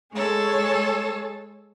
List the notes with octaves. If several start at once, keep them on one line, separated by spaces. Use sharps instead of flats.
G#3 G#4 A4 C#5